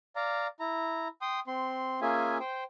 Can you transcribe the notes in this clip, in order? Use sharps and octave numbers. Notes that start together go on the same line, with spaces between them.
D5 F5 A#5
E4 A#5
G5 C6 D#6
C4 C6
A#3 C#4 F4 G#4 E5 G#5
C5 G5